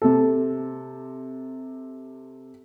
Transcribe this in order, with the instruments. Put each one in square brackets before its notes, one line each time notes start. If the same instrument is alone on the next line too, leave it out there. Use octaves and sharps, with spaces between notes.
[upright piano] C3 A4